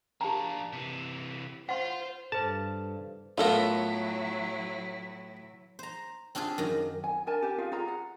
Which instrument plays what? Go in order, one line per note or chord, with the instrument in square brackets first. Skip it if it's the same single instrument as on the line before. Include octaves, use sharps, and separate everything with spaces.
[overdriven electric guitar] A#3 D4 [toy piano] G4 A5 A#5
[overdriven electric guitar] C3 E3
[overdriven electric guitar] F4 [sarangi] C5 [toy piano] F#5 C6
[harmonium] G2 [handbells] A4 C5 [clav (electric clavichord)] A5
[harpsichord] A2 B3 [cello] F#3 E4 [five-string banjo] F4 A4 A#4
[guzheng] C5 A#5
C4 D4 F4 G4 G#4
F#2 D#3
[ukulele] G#5
D4 A#4 G#5 A5
G4 G#5
F4 G#4 F5
F4 G#4 A#5
F#5